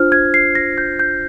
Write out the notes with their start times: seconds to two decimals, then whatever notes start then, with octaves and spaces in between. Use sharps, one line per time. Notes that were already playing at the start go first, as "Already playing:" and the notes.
Already playing: D4 F4 C5 F6
0.12 G#6
0.34 C7
0.55 A#6
0.78 G6
0.99 G6